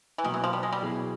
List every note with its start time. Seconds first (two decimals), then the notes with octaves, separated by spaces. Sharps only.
0.18 E3
0.24 B2 D#3 F#3 A#3
0.34 E3
0.44 F3
0.53 G3
0.63 G#3
0.73 G3
0.82 B2 F#3 B3 E4 G#4